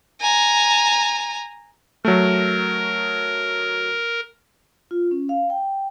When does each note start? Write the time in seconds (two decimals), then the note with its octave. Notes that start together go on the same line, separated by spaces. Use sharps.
0.21 G#5 A#5
2.05 F#3 A3 A#4
4.91 F4
5.11 C#4
5.29 F5
5.50 G5